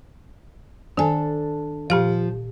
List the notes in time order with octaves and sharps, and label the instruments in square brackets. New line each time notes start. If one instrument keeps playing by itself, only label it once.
[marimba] D#3 G#5 [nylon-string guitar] D4 A4
[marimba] A#2 G4 F5 [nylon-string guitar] F3